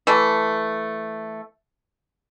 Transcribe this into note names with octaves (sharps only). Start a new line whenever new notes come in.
E3 A3